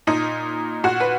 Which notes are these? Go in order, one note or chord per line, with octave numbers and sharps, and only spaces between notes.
A#2 D#4
A#2 F#4
B4